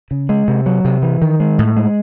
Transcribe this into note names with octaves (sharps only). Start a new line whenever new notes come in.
C#3
G#3
C3
F#3
C3
E3
D#3
G#3
A2
G#3